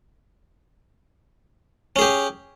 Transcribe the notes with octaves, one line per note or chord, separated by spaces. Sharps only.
C#4 G4 G#4